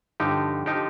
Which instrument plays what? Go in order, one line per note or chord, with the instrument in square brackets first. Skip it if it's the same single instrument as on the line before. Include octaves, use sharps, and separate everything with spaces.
[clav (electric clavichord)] G2 D3 F3 D#4 G4
D3 F3 D#4 G4